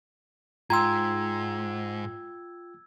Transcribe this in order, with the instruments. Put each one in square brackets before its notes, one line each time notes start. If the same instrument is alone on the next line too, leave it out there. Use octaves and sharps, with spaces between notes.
[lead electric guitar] G#2 [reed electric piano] F4 G5 [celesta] A#5 C6 [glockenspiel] E6 G#6